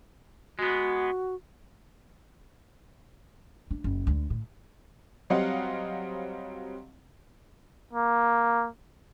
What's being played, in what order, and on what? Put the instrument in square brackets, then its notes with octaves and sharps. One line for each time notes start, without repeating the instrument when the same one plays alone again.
[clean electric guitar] G#3 B3 [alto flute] F#4
[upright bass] D4
F#1
D2
A2
[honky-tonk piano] F#3 G3 C4 D#5 F5 F#5
[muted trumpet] A#3